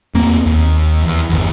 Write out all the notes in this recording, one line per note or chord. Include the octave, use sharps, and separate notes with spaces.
E2 A#3 C4
D#2
E2
G1 E2